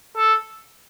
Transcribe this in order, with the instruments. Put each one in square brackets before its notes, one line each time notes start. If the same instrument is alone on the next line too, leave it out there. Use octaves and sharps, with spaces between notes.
[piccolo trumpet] A4